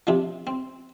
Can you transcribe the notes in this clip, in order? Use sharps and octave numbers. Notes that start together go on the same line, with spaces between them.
C3 F3 D4
C4